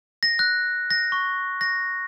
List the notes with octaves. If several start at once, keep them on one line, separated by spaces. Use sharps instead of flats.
A#6
F#6
A#6
C#6
A#6